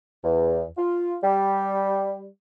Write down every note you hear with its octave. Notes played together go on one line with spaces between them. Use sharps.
E2
F4
G3